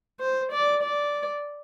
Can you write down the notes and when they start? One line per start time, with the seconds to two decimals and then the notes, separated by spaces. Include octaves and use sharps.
0.20 C5
0.52 D5
0.83 D5